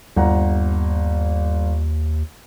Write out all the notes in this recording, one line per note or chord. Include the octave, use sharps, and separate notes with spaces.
G1 D#2 F#5 A#5